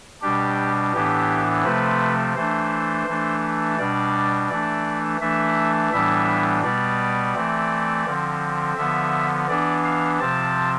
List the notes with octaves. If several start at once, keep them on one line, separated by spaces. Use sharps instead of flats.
B2 G3 D4 G4
A2 E3 B3 D4 G4
C3 F3 A3 C4 B4
E3 A3 D4 C5
E3 A3 D4
B2 G3 D4 D5
E3 A3 D4 D5
E3 A3 D4 E5
A2 E3 G3 B3 D4 E5
B2 G3 B3 D5
E3 A3 C4
D3 F3 C4
D3 F3 B3 E5
E3 B3 D4 D5
F5
C3 F3 C4 A5